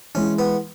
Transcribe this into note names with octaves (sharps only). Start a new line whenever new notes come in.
E3 G#3 C#4
B3